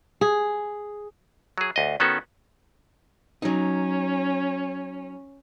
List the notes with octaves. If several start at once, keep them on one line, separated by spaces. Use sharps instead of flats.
G#4
F#3 G#4
D2 D#5
D#3 B3 C#4 F#4 A4
F#3 C#4 D#4